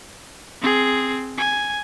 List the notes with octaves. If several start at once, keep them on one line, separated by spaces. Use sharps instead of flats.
C4 G#4
G#5